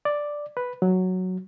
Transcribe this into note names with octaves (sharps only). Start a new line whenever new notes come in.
D5
B4
F#3